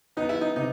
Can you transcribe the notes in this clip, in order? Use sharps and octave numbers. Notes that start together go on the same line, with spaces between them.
B3 D#4
E4
D#4
C3 D#4